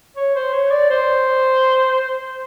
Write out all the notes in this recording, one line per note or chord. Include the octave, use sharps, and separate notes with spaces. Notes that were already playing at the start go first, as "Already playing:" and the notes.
C#5
C5
C#5
D5
C5